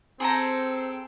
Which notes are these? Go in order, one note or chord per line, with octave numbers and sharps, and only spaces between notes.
C4 G#4 A4 A#5